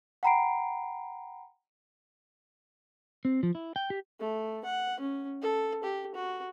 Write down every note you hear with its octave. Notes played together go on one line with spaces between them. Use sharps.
F#5 G5 A#5 B5 C7 D7
C4
F3
E4
G5
G4
A3
F#5
C#4
A4
G4
F#4